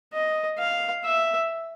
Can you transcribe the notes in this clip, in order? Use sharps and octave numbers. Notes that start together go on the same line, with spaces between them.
D#5
F5
E5